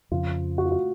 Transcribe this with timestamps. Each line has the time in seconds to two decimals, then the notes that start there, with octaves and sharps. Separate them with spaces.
0.11 F2 C#3 F3 F4
0.58 F#4
0.65 F4
0.72 F#4